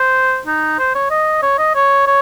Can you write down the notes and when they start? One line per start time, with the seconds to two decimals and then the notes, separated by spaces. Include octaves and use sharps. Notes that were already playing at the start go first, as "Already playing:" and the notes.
Already playing: C5
0.47 D#4
0.79 C5
0.95 C#5
1.10 D#5
1.42 C#5
1.58 D#5
1.75 C#5
2.07 C#5